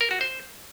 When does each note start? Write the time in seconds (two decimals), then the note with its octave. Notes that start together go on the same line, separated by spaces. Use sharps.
0.01 A#4
0.11 F#4
0.21 C5